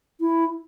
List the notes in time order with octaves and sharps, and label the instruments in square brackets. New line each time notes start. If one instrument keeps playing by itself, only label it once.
[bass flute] E4